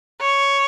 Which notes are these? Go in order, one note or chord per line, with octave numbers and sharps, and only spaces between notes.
C#5